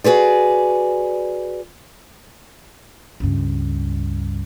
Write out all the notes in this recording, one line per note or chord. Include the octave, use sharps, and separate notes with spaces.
F#4 G#4 B4 D5
C#2 G2